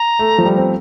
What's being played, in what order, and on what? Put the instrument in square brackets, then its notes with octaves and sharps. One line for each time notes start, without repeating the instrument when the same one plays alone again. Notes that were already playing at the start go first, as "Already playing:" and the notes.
Already playing: [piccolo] A#5
[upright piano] A3
F3
G3
C4